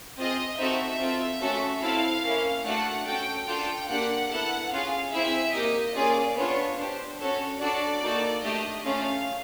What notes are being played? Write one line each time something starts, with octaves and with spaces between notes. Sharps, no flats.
C4 F4 G#4 D#5
C4 D#4 F#4 A4 E5
C4 F4 A4
A3 C#4 F#4 A4
C4 E4 A4 F5
A#3 C#4 E4
A3 D4 F#4 A4 F#5
C#4 F#4 A4 G5
D4 F4 A4 G5
A#3 D4 G4 F#5
B3 E4 A4 F#5
C#4 F4 G#4 F5
C4 E4 G#4 E5
A#3 D#4 G4 D#5
A#3 C#4 F4 G#4 D5
B3 D4 F4 C#5
D4 C5
G4
C#4 F#4 A4 C#5
D4 F#4 A4 D5
A#3 D#4 F#4 A4
A3 D4 G4 D#5
A3 C#4 F4 G#4 F5